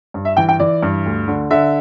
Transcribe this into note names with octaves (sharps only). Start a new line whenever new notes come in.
G2
E5
E3 G5
G5
E3 D5
G2
D2
D3
D3 E5